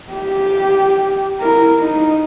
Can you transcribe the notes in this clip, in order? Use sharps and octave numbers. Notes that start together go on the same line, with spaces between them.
G4
E4 A#4
D#4